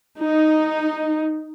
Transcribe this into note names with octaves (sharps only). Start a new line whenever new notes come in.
D#4